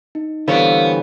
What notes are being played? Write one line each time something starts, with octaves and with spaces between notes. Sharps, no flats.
D#4
D3 E3 G3 B3 A4 C5 C#5 F5